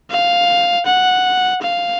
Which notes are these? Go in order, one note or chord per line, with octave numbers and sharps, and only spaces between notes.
F5
F#5
F5